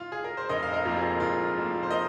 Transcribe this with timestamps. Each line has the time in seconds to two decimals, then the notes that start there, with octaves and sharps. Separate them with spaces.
0.00 F4
0.12 G#4
0.24 A#4
0.37 C5
0.49 F1 A#4 D#5
0.63 F5
0.73 A#4 D#5
0.85 F2 F3 A#3 F4
0.97 G#4
1.20 F1 F4 A#4
1.56 F2 F3 A#3
1.83 C5
1.91 A#4 D#5